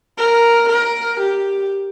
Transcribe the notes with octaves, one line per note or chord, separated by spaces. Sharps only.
A#4
A#4
G4